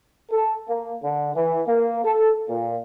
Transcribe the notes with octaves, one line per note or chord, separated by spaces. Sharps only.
A4
A#3
D3
E3
A#3
A4
A#2